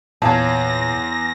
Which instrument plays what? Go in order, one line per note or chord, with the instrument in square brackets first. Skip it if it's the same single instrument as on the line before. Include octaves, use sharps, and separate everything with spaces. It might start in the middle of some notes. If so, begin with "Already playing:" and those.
[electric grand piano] E2 [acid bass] A#2 [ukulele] C#5 F5 A5 [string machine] A#6